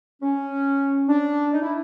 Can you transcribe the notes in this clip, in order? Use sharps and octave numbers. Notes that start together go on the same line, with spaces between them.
C#4
D4
D#4
E4